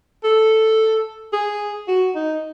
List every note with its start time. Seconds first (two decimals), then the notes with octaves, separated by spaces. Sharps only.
0.24 A4
1.33 G#4
1.88 F#4
2.15 D#4